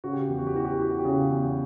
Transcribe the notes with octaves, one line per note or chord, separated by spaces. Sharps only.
C#3 F#4
G4
F#4
E2 G4
F#4
G4
E3 F#4
G4
F#4
E3 G4
F#4
G4
C#3 F#4
E2